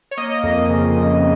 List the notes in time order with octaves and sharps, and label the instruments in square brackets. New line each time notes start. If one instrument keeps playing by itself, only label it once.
[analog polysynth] C#5
A#3 D#5
F2
C#3
F2